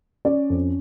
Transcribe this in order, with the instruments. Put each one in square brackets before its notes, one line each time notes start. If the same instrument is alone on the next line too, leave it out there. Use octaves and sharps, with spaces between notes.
[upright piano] C#4 D5
F2